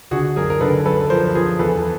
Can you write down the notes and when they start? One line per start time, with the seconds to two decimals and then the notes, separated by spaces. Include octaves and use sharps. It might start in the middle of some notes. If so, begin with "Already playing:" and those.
0.11 D3 F#4 G#4
0.36 F#2 G#4 A#4
0.50 A#4
0.61 D3 A4 B4
0.85 F#2 A4 B4
1.10 F3 A#4 C5
1.28 B4
1.35 F3 G#4 A#4
1.59 E2 A4 B4